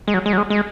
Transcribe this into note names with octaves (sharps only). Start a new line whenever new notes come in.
G#3
F#3
G#3
F#3
G#3
G#3